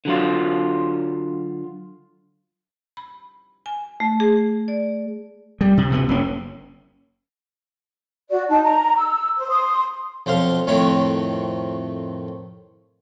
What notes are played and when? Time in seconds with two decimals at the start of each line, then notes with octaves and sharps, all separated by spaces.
0.05 D3 F#3 F4
2.97 B5
3.66 G#5
4.00 A3
4.20 G#4
4.68 D5
5.61 G3
5.77 C3
5.90 D2 C3 B3
6.09 F#1 A#3 C#4
8.30 F#4 D5
8.49 D#4 A5
8.64 A#5
8.97 E6
9.37 C5
9.48 C6 D#6
10.26 B1 F2 C5 F5 C6
10.67 F2 A2 D#3 C4 C#5